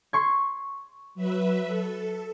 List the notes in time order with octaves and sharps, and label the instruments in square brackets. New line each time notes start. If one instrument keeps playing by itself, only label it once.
[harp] C6 C#6 G#6
[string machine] F#3 B4 E5
A4